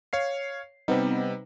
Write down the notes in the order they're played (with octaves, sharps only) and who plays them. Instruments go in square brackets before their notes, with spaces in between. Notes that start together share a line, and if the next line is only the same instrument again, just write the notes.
[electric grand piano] C#5 F5 C7
[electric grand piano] C3 G3 [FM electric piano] B3 C4 D#4